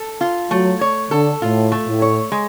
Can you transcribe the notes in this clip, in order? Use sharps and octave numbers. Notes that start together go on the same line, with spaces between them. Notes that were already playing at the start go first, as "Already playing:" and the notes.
Already playing: A4
F4
F#3 A3
C#5
D3 A4
A2 F4
A3
A2
C#5
G#3